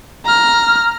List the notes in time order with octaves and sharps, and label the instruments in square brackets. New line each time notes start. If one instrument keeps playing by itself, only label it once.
[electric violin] A#5 F6